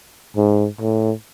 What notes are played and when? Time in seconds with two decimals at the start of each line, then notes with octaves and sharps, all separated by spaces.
0.36 G#2
0.81 A2